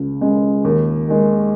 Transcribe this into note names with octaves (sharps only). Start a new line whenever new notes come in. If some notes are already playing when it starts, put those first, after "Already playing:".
Already playing: C#2
C#3 G#3
D#2
D#3 G#3